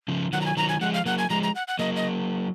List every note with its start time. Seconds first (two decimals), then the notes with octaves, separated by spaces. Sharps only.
0.08 C#3 F3
0.33 D#3 F#3 F#5
0.41 A#5
0.46 G#5
0.57 D#3 F#3 A#5
0.69 G#5
0.81 F3 G#3 F#5
0.94 F5
1.06 F#3 A#3 F#5
1.18 G#5
1.30 F3 G#3 A#5
1.43 A#5
1.55 F#5
1.68 F#5
1.79 F#3 A#3 D#5
1.96 D#5